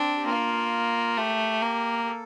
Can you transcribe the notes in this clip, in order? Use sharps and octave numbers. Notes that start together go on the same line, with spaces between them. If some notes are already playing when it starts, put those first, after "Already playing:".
Already playing: C4 D4
G4
A#3 F4
A3 G4
A#3
A4